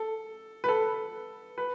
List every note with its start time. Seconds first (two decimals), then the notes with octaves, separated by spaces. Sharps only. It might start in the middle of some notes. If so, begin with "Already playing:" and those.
Already playing: A4
0.64 B4
0.68 A4
1.58 B4